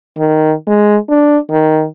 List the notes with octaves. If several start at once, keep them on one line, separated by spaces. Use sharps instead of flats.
D#3
G#3
D4
D#3